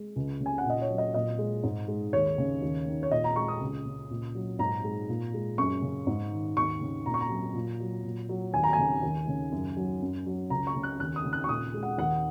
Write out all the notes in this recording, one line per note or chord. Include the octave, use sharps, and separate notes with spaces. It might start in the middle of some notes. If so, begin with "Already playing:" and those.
Already playing: G#3
C#2
C#3
G#5
F#5
A#2 D#5
C#5
F#3
D#5
A#2 D#5
G#3
G#2
G#3
D#2 C#5
C#3
D#2
D#3
C#5
A#2 D#5
A#5
G#3 C#6
D#6
C#2
C#3
A#2
F#3
G#2 A#5
G#3
A#2
G#3
F#2 C#6
C#3
G#2
D#3
D#2 C#6
C#3
A#2 A#5
C#6
A#5
F#3
A#2
F#3
A#2
F#3
D#2 G#5
A#5
C#3 G#5
D#2
C#3
F#2
F#3
F#2
F#3
C#2 A#5
C#6
C#3
F#6
D#2 F#6
D#6
C#3
F#6
C#6
A#2 D#6
G#3
F#5
D#2 F#5